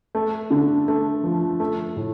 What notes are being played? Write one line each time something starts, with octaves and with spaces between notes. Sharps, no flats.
A3
D3
A3
F3
A3
A2